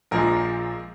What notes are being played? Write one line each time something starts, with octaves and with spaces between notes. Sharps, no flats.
A#1 A#2 F3 G#3 A#4